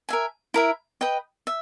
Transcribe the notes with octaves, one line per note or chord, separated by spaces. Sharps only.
A#4 E5 G#5
E4 A#4 E5
B4 D#5 G5
E5